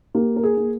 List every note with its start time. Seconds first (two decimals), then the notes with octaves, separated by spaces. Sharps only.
0.15 A#3 G4
0.36 A#4
0.43 G#4
0.57 A#3